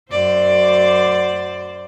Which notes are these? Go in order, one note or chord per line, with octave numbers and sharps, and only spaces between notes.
F#2 C5 D5